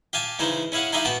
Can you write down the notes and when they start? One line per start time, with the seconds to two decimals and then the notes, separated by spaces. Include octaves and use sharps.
0.13 G4 F5 G#5 A5
0.39 C#3 E3 D#4 G#4 C5
0.72 C#4 E4 G#4 F5 F#5
0.93 D#4 E4 G4 G#4 E5 F5
1.05 B3 F#4 G5 A5